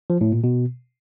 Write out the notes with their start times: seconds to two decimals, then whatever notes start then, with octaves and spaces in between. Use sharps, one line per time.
0.10 F3
0.21 A2
0.32 A#2
0.44 B2